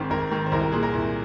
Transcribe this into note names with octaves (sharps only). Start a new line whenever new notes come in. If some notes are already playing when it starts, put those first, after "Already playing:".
Already playing: G#1 G#2 D#3 C4
G#1 A#4
G#2 D#3
C5
C2 A#4
A#4
A#2 G#4
A#4
C2